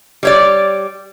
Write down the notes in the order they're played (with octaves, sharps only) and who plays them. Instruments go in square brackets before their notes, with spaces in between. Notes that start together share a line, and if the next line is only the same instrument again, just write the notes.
[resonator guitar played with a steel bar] G3 C#5 D5